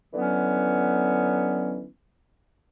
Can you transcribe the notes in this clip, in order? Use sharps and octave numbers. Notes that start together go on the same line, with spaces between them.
D3 E3 F#3 B3 C#4